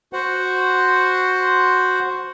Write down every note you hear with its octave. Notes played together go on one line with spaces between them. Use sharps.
F#4 C5 F#5